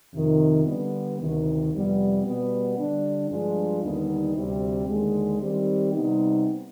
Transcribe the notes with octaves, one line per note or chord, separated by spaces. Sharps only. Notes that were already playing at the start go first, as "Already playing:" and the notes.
F2 C3 D#3
D3 G3 B3
D2 C3 D#3
F2 C3 G3 B3
B2 G3 B3
D3 G3 D4
G2 F3 G#3 D4 F4
D#2 D3 G3 B3 D#4
D2 C3 G3 C4 G4
D#2 D3 G#3
D#3 G3 C4 G4
C3 G3 B3 D#4